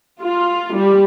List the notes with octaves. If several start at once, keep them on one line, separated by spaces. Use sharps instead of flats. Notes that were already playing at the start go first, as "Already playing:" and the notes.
F4
G3